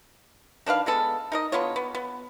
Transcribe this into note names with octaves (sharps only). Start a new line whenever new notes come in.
D#3 D4 B4 F5
G#3 B3 A4
D#4 A#4 D#5
D3 B3 F4 C#5
B3
B3